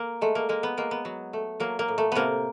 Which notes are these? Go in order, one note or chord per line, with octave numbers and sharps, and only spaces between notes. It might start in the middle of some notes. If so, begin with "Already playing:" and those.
Already playing: A#3
G#3 A3
A#3
G#3 A#3
B3
G#3 A#3
B3
F#3
A3
F#3 A#3
A#3
A2
A3
C3 A#3 B3